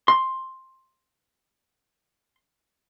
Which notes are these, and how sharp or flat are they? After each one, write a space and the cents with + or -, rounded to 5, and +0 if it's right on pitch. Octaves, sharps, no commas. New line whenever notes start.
C6 +10